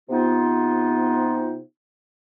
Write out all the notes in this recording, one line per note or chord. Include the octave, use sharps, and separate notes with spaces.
C3 B3 D#4 F4